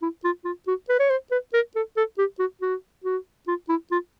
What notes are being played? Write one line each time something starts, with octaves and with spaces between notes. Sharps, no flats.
E4
F4
F4
F#4
B4
C#5
C5
B4
A#4
A4
A4
G4
F#4
F#4
F#4
F4
E4
F4